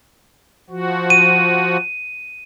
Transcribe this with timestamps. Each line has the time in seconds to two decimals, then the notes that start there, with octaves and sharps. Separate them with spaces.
0.70 F3 F#4
1.10 D#7